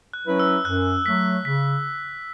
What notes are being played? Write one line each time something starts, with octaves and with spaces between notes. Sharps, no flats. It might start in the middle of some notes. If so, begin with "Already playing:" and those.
F#6
F#3 C#4 E4 B4
E6
F#2 F#6
F#3 A3 B6
C#3 B6